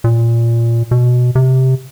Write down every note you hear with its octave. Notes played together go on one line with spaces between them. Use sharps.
A#2
B2
C3